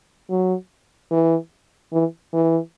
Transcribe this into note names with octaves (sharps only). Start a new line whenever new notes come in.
F#3
E3
E3
E3